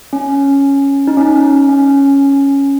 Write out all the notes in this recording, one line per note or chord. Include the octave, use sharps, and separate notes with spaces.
C#4
D#4
C#4
C#4